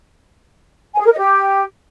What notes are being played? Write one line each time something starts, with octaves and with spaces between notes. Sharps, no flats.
G#5
G#4
A#4
D#5
G4